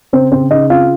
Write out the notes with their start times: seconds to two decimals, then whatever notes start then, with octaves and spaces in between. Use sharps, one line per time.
0.13 C#3 C4 C5
0.32 C#3 C4 C5
0.50 C#3 D#4 D#5
0.70 C4 F4 F5